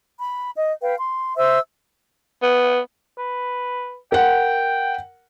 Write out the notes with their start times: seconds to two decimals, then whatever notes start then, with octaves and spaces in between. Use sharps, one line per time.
0.19 B5
0.56 D#5
0.82 B4 F5 G5
0.98 C6
1.37 C5 E5 E6
2.42 B3
3.18 B4
4.12 A#4 F#5 G5